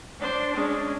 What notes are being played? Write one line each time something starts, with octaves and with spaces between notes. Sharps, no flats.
D4 C5
G#3 C#4